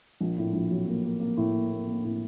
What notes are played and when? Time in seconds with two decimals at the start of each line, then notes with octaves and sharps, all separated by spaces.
0.21 A#1
0.38 A2
0.53 A#1
0.71 F#3
0.87 A#3
1.04 A#3
1.20 A#3
1.37 A2
1.53 A#3
1.70 A#3
1.87 A#3
2.04 A2